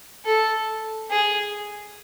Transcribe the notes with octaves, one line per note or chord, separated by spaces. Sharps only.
A4
G#4